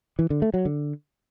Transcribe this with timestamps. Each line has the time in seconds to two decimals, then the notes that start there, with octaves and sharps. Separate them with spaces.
0.19 E3
0.30 D3
0.42 A3
0.54 F#3
0.65 D3